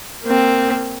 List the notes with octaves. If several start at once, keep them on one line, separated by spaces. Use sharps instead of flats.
A#3 C4